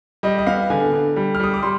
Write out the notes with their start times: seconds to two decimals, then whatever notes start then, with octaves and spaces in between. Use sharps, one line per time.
0.23 G3 D#5
0.38 D#5
0.47 B3 F5
0.70 D3 G#5
0.93 D3
1.16 G3
1.35 F6
1.40 G3 D#6
1.54 D6
1.63 G3 C6